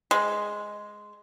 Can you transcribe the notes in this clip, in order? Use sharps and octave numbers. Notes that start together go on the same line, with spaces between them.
G#3